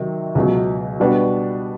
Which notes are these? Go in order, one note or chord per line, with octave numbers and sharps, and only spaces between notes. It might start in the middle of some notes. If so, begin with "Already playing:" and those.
Already playing: C3 D#3 F#3 D#4
C#2 B2 F#3
B2 G3 B3 D4 F#4